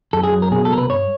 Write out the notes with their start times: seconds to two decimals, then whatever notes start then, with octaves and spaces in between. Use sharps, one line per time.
0.13 F#2 A4
0.23 G#4
0.32 F#3
0.42 A#4
0.51 B2 G#4
0.65 A4
0.71 C2 A#4
0.78 B4
0.90 G2 C#5